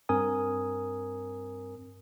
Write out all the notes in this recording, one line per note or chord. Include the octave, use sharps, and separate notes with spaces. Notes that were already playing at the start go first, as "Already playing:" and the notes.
G2 C4 A#4 G#5 D#6